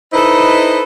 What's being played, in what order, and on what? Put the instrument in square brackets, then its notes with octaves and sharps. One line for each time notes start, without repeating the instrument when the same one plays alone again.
[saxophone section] D#4 E4 A4 B4 C5 D#5